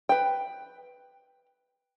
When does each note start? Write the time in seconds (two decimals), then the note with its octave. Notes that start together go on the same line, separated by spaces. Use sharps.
0.09 B4 G5